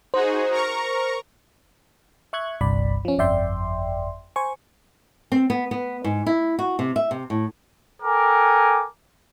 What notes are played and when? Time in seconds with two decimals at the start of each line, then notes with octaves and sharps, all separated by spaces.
0.14 D#4 F#4 G#4 C5
0.51 A#4 A#5 C#6
2.33 E5 C#6 F#6 G#6
2.61 G1 C2 G2 D5 B5
3.05 F3 C#4
3.18 G1 F2 D5 E5 G5 C6
4.36 C5 G#5 C#6
5.32 C4
5.50 B3
5.71 B3
6.04 G#2
6.26 E4
6.59 F#4
6.79 C3
6.96 E5
7.11 C3
7.30 A2
8.03 A4 A#4 G5 G#5 D6